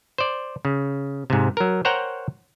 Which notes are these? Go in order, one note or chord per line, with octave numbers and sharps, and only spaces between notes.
C5 D5
C#3
G#2 C3
F#3 A#4
A#4 C5 C#5 F#5 G5 A#5